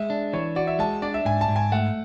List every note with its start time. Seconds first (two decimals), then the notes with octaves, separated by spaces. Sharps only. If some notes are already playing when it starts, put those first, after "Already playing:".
Already playing: G#3 E5
0.10 D4
0.33 E3 C#5
0.56 F#4 D5
0.67 E5
0.79 G#3 A5
1.02 D4 D5
1.14 E5
1.25 G#2 G#5
1.41 A5
1.48 G#2
1.56 G#5
1.72 A3 F#5